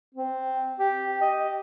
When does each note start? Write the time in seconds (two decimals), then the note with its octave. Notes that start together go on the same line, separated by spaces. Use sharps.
0.15 C4
0.79 G4
1.21 D#5